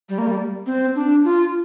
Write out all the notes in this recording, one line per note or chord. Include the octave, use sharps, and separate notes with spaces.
G3
A#3
G3
C4
D4
F4